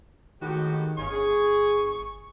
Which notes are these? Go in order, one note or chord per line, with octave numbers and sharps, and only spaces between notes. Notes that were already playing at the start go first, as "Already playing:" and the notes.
A2 D#3 G#3 F#4 G4
G1 C#3 C#4 C#6
G#4